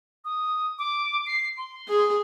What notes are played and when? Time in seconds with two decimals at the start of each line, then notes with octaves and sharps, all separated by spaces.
0.25 D#6
0.78 D6
1.26 C7
1.57 C6
1.88 G#4